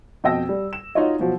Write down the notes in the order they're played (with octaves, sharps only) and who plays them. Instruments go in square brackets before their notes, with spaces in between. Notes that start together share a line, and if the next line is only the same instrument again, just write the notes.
[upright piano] F2 B2 D#5 G5 E6 A#6
G3
E7
D#4 F4 F#4 C#5 D#5
B2 F3 F#3